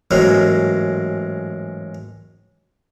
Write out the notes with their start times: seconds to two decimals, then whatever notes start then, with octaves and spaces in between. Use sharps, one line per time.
0.11 A1 G#2 F#3 A#3